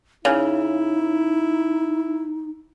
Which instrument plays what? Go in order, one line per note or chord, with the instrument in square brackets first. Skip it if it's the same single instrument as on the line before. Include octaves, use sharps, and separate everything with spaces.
[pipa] C#3 [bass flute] D#4 [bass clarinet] E4